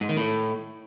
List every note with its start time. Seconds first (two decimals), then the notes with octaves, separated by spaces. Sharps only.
0.01 G#2
0.09 D#3
0.17 A2